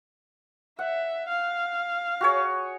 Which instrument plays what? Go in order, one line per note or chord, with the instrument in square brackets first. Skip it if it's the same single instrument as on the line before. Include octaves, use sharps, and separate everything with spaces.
[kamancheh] E5 [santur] F#5
[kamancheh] F5
[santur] F#4 G#4 C#5